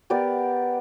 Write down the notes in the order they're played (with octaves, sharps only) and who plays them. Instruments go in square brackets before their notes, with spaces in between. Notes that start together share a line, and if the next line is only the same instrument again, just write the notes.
[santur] B3 G4 A#4 D5